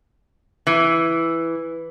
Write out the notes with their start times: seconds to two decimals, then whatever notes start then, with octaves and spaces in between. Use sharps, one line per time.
0.67 E3